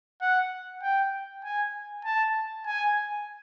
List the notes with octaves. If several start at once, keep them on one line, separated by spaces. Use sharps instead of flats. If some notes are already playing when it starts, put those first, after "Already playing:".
F#5
G5
G#5
A5
G#5